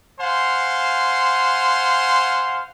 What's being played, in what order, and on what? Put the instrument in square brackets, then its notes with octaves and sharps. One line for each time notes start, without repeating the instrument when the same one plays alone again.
[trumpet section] C5 F5 F#5 G#5 C6